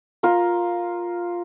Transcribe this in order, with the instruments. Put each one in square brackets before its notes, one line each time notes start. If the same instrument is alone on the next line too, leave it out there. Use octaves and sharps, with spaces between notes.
[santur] F4 A#4